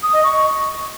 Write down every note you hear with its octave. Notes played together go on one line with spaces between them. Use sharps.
D#6
D#5
C#6